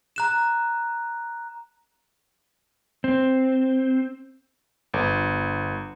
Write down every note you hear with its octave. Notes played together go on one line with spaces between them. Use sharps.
A#5 F#6 E7
C4
G1